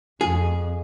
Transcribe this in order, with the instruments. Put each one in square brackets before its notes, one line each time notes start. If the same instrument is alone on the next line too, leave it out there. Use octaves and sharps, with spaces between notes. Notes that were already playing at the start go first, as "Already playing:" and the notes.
[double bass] F2 [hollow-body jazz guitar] G#4